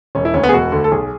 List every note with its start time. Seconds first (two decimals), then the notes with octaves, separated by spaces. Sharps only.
0.15 E1 C#4
0.25 E4
0.34 D2 D3 C#4
0.43 B3
0.49 G#4
0.53 E1 F#4
0.72 D2 D3
0.84 A4
0.91 B1 G#4